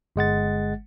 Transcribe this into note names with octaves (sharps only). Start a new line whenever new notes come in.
G1 G#3 F#5 A6